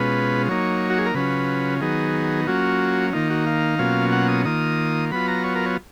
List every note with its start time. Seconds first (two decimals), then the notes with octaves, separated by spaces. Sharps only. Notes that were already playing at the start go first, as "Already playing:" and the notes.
Already playing: B2 G#3 C#4 F4 B4
0.48 F#3 A#3 D#4 C#5
0.90 F#4
0.98 G#4
1.06 A#4
1.14 C#3 F#3 C#4 F4 B4
1.81 D#3 F#3 B3 D#4 G#4
2.47 F#3 A#3 C#4 F4 F#4
3.13 D#3 A#3 D#4 F4
3.30 F#4
3.46 F5
3.79 B2 F#3 A#3 C#4 F4
4.12 F#5
4.28 D#6
4.45 D#3 A#3 F4 D#6
5.11 F#3 B3 F4 B5
5.28 A#5
5.44 C#5
5.56 A#4
5.66 C#5